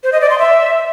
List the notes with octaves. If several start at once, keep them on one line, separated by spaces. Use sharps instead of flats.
C5
D#5
D5
C6
E5